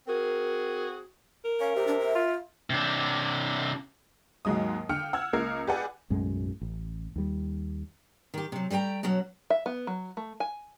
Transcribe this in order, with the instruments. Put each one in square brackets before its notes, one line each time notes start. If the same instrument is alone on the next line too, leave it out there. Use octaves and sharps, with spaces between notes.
[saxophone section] C4 F#4 G#4 [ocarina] A#4
[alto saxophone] A#4
[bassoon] C#4 [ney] F5
[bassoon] C3 [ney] G4
[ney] D4
E5
[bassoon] F4
[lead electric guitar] C3 D4
[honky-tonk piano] D#2 G#2 F#3 G#3 D#6
D3 F5 G5 F6 C#7
F#5 E6 F6 G#6
C#2 A#3 A#4 G#6 C7
G4 G#4 B4 D5 F#5 G#5
[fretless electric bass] B1 F#2 A2 G#3
A1
D#2 G3
[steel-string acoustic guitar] D#3 G4
C3 F#3
G3 A3 B4 G5 A#5
B2 F#3 C#4 F#4
[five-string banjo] E5
B3
F#3
A3
G#5